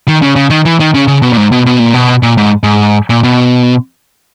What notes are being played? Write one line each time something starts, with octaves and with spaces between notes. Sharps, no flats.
D#3
C#3
C#3
D#3
E3
D#3
C#3
C#3
B2
A#2
G#2
B2
B2
A#2
B2
A#2
G#2
G#2
A#2
B2